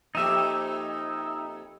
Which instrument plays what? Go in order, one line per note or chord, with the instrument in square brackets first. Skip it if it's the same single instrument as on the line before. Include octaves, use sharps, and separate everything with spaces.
[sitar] F2 A#3 G4 [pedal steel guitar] D#4 E5